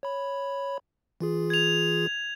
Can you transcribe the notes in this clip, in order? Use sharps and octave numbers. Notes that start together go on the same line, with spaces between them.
C#5 B5
E3 F4 G#4
G#6 F7